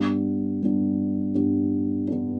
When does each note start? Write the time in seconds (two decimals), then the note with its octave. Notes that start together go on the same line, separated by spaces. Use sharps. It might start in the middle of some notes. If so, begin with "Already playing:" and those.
Already playing: G2 G3 B3 D4
0.62 G2 G3 B3 D4
1.35 G2 G3 B3 D4
2.08 G2 G3 B3 D4